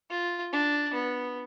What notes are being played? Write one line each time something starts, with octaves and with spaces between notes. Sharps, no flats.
F4
D4
B3